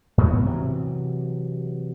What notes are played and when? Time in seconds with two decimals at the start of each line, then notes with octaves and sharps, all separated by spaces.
0.18 G#2 B2 E3 B3
0.45 C3 E3 F#3